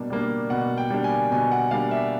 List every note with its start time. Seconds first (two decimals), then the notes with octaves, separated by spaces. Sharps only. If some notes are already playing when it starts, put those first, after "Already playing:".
Already playing: B2 G3 A#3 D4
0.10 G3 A#3 D4
0.50 B2 F#5
0.78 G5
0.90 G3 A#3 D4
1.04 G#5
1.32 B2 G#5
1.52 F#5
1.71 G3 A#3 D4 F5
1.91 E5